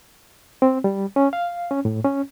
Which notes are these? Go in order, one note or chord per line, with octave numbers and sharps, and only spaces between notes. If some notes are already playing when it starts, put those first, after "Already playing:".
C4
G3
C#4
F5
C#4
A2
C#4